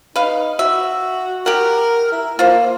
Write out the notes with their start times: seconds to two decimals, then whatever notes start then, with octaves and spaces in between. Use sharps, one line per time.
0.16 D#4 B4 F5
0.59 F#4 E5
1.46 G4 A#4 F#5
2.12 E4
2.39 A#3 F4 C5